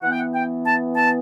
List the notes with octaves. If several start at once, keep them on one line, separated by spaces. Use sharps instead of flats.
E3 B3 F#5
G5
F#5
G5
A5
A5